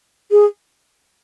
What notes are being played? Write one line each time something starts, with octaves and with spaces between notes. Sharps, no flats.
G#4